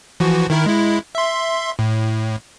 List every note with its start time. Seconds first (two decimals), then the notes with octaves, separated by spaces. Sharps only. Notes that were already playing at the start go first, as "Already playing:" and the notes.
0.20 E3 F3 F#4
0.50 D#3 E4 A#4
0.66 G#3 E4
1.15 E5 C6
1.79 A2